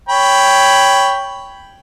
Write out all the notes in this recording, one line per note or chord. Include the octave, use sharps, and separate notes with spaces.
C#5 G5 B5